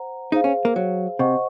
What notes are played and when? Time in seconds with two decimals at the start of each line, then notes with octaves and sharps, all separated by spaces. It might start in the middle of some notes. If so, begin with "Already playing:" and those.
Already playing: C5 F#5 A#5
0.32 D#4 G#4 C5 F5
0.44 C#4
0.65 A#3
0.76 F#3
1.19 C3 C5 D#5 F#5 C#6